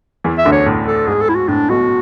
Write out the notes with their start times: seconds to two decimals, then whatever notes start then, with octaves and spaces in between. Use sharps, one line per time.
0.24 E2 E3
0.38 E5
0.45 D2 D3
0.52 C#5
0.66 A2
0.87 A4
1.07 G#2 G#4
1.21 A4
1.29 E4
1.35 F#4
1.48 A2 D4
1.69 B1 B2 F#4